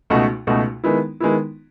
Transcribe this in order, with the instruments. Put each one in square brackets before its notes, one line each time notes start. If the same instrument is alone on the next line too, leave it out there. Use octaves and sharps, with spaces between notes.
[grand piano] C#2 B2 A3 D#4 F#4
C#2 B2 A3 D#4 F#4
D#3 G#3 B3 E4
D#3 G#3 B3 E4